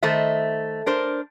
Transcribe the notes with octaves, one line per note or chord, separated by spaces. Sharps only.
D#3 A3 C5 D#5 E5
D4 A#4 C5